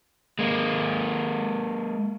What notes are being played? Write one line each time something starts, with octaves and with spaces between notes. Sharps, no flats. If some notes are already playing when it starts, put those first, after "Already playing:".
G#3 A#3